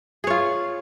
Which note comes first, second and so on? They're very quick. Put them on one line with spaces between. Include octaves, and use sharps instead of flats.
G#4 C#5 F4